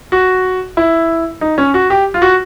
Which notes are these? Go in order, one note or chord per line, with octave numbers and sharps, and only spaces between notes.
F#4
E4
D#4
C#4
F#4
G4
F4
F#4